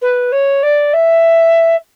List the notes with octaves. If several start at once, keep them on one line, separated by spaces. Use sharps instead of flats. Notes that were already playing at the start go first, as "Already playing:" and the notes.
B4
C#5
D5
E5